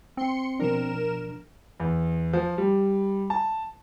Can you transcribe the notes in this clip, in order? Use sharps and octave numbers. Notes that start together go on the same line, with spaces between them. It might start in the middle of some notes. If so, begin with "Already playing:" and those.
C4 C6 C#7
B2 F3 D4 A#4 E7
E2
F3
G3
A5